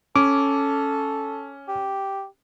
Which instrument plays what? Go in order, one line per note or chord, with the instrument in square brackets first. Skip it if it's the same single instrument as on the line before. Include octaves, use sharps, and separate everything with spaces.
[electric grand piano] C#4 [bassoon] A4 [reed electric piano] D6
[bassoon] G4